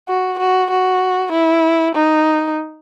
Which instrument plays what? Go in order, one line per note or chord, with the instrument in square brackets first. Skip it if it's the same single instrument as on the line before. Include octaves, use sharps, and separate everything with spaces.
[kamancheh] F#4
F#4
F#4
E4
D#4